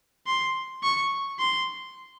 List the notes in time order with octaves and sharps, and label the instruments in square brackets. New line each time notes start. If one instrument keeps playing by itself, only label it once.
[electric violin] C6
C#6
C6